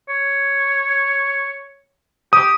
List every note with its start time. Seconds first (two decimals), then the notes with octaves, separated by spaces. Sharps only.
0.09 C#5
2.33 G4 D#6